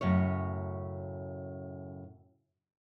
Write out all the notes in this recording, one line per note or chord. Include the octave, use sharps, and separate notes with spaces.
F#2 A2 C#3 C#5